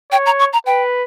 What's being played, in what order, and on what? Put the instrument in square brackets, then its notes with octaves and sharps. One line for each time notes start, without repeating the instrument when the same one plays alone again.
[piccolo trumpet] C#5 [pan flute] G5
[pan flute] A#5
C#6
A#5
[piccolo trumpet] B4 [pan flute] G5